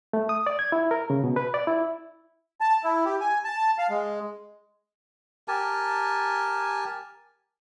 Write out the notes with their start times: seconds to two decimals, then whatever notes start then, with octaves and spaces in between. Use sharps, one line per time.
0.13 A3
0.29 D#6
0.47 D5
0.59 G#6
0.72 E4
0.91 A#4
1.10 C#3
1.24 B2
1.36 B4
1.54 D5
1.67 E4
2.61 A5
2.84 E4
3.05 G4
3.21 G#5
3.44 A5
3.78 F5
3.90 G#3
5.48 G4 A#4 G#5 A5